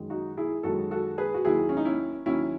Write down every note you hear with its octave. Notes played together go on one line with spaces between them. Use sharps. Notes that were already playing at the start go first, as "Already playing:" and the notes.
Already playing: F#2 D#3 G#3
D#4 F#4
E4 G#4
F#2 D#3 G#3 F#4 A4
F#4 A4
G#4 B4
F#4
D#2 D#3 F#3 E4 G#4
C#4
D#4
C#4 E4
D#2 D#3 F#3 C#4 E4